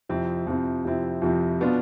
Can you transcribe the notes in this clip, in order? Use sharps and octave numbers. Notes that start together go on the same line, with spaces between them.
F2 C3 F3 C4 E4
F2 C3 F3 C4 E4
F2 C3 F3 C4 E4
F2 C3 F3 C4 E4
B2 B3 D4 F4